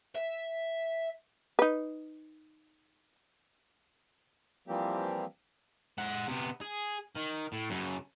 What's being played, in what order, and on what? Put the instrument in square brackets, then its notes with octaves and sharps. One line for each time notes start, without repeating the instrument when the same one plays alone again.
[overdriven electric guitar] E5
[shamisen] D#4 B4
[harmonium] E3 F3 G3 A#3 C4 G4
[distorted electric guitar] G#3 F#5
C3 B3
G#4
D#3
A2
F#2 C#3